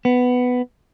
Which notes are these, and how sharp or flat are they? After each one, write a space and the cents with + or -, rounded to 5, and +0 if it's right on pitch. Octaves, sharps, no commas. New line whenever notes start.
B3 +10